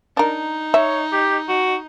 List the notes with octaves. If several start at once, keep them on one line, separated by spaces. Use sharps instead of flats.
D4 D#4 A#4
C#5 E5
G4
F#4